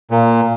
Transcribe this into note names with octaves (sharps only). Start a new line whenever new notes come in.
A#2